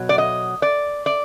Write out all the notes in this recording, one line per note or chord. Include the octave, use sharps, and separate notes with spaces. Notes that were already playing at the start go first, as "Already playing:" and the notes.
Already playing: B2 F#3
D5
D#5
D5
D5